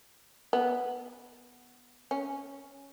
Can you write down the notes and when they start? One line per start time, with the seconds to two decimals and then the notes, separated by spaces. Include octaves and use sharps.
0.53 B3
2.11 C#4